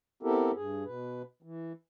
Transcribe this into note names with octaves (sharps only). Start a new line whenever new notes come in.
B3 C4 E4 G4 A4 A#4
G2 G#4
B2 B4
E3